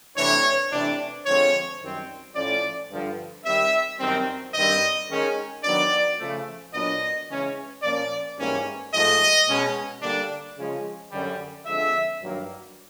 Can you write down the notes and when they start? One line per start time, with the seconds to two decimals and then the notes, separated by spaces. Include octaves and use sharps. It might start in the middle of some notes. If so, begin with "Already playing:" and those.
0.17 C3 E3 A3 D4 C#5
0.72 C3 E3 A3 D4
1.26 D3 F3 G#3 C4 C#5
1.81 F#2 D#3 G3 C4
2.36 A2 F3 A3 C#4 D5
2.90 G2 D3 F3
3.45 D#3 G3 C4 E5
4.00 F#2 D#3 G3 C4
4.54 G2 D#3 G3 C4 D#5
5.09 D#3 G#3 C#4
5.64 D#3 F#3 B3 D4 D5
6.19 C#3 F3 A3
6.73 A#2 F#3 B3 D4 D#5
7.29 C#3 E3 G#3 C#4
7.83 A#2 F3 A#3 C#4 D5
8.38 G#2 E3 G3 A#3 C#4
8.93 G#2 F3 A3 D#5
9.47 B2 G#3 C#4
10.02 D3 G3 A#3 D4
10.57 C#3 F3 G#3 C#4
11.12 F#2 D3 G3
11.66 D3 F3 G#3 C4 E5
12.21 G2 D#3 F#3 A#3